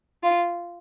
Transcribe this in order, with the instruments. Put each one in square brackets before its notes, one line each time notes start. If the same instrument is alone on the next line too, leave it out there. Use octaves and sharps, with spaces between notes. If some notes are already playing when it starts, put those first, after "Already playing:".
[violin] F4